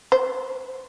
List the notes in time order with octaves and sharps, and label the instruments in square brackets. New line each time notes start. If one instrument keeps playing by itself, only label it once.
[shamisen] C5